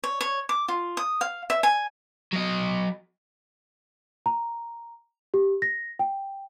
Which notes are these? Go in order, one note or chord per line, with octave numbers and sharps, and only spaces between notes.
C#5
C#5
D6
F4
D#6
F5
E5
G#5
F#3 D#5
A#5
G4
A#6
G5